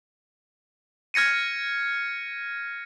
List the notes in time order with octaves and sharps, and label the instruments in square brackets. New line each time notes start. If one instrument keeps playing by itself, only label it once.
[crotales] F6 G#6 A#6 C#7 D#7